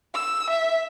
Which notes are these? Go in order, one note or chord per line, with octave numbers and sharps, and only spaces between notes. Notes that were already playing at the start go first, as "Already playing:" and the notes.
E6
E5